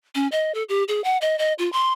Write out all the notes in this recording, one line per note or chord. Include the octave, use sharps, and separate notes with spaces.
C#4
D#5
A4
G4
G#4
F#5
D#5
D#5
F4
C6